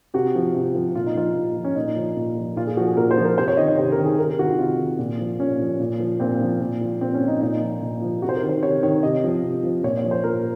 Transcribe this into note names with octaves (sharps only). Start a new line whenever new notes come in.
C3 F#4
F3
C3
F3
A#2 F4
D#4
F3 F4
A#2
F3
C#4
A#2 D#4
F3
A#2
F3
A#2 F4
G#4
F3 F#4
G#4
A#2 A#4
C5
F3
A#4
C3 C5
C#5
D#3 D#5
C#5
C3 C5
A#4
D#3
G#4
C3 A#4
G#4
D#3 F#4
F4
C3 F4
D#3
A#2
F3
A#2 C#4
F3
A#2
F3
A#2 C4
F3
A#2
F3
A#2 C4
C#4
F3
D#4
A#2 D#4
F3
A#2
F3
C3 F#4
C5
A#4
D#3
C5
C3 C#5
D#3 C#5
C3 D#5
F3
C3
F3
A#2 C#5
C#5
F3
C5
A#2 A#4